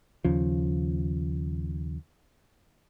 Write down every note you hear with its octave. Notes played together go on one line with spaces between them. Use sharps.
D#2 C#3 F3